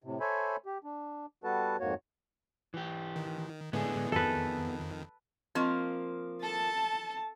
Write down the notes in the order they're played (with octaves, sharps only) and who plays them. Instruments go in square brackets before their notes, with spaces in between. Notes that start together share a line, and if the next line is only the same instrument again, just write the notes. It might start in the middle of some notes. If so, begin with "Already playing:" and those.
[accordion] A2 C3
A4 C5 C#5 E5 G#5 B5
G4
D4
G3 B3 F#4 A4 B4 A5
F2 G#2 A#3 F#4 C#5
[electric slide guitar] E3 G4
[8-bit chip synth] D#3
[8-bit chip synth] A2 D3 G#3 [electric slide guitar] B3 G#4
[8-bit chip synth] F2 D#3 [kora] A4 B4
[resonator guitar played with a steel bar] F3 A#3 [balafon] C4 D#5 C#6
[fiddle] A4 [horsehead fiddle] A5